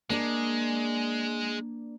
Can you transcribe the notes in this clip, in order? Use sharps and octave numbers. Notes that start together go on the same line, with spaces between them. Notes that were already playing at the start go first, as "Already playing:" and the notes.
G#3 A#3 D4 D5